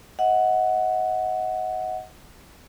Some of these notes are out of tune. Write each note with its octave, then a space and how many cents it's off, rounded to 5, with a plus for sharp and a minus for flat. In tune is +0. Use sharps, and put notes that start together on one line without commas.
D#5 +30 F#5 +0